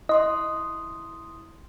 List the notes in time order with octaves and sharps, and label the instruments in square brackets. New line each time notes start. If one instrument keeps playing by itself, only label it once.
[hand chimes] E4 C6 D#6 [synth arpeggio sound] D#5